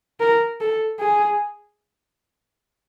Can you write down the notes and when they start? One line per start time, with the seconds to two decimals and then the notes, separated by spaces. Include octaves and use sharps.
0.20 A#4
0.61 A4
1.00 G#4